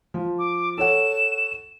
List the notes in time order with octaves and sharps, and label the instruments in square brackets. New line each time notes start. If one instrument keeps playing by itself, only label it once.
[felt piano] F3
[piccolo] D6
[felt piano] A4 C#5 F#5 [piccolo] E7